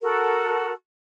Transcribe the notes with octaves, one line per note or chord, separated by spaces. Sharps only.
F#4 A4 A#4